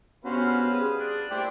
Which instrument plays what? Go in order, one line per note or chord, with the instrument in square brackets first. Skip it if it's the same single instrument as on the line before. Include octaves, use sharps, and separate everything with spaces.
[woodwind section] G2 C#3 B3 [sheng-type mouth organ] C#4 F#4 [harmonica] B4 C5 F5
[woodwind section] G3 G#4 [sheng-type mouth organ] D#6
[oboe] D4
[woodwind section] A#2 A3 [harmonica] E4 G4 C5 [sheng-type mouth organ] D5 G5